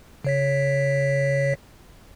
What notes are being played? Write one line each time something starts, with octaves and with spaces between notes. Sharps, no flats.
C#3 C#5 B6